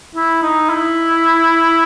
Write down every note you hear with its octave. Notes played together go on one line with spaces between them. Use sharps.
E4
D#4
E4